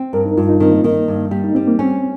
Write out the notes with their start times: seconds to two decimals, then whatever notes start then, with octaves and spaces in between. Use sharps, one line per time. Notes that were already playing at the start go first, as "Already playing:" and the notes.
Already playing: C4
0.13 G2 A#4
0.25 D#4
0.37 G2 F4
0.49 D#4
0.60 D#3 C4
0.73 A#3
0.84 D#3
1.08 G2
1.31 G3
1.44 D#4
1.55 G3 C4
1.68 A#3
1.79 C4 C#4